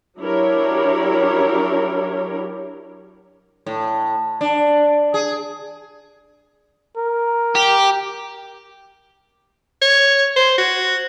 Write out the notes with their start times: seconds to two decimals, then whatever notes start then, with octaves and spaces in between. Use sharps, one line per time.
0.20 F#3 D4 E4 G4 A#4 C#5
3.66 A2
4.41 D4
5.14 G#4
6.97 A#4
7.55 G4
9.82 C#5
10.36 C5
10.58 F#4